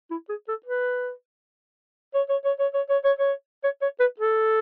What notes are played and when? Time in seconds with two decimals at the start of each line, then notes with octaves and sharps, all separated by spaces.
0.11 E4
0.29 G#4
0.48 A4
0.66 B4
2.14 C#5
2.29 C#5
2.44 C#5
2.59 C#5
2.74 C#5
2.90 C#5
3.04 C#5
3.19 C#5
3.64 C#5
3.82 C#5
4.00 B4
4.20 A4